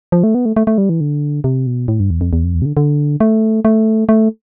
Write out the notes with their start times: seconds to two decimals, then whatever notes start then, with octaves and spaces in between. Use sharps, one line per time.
0.12 F3
0.24 A3
0.35 B3
0.45 A3
0.56 A3
0.67 A3
0.78 G3
0.89 E3
1.01 D3
1.44 C3
1.67 B2
1.88 A2
2.00 G2
2.10 E2
2.21 F2
2.33 E2
2.44 F2
2.55 E2
2.62 C3
2.66 D3
2.77 D3
3.20 A3
3.65 A3
4.09 A3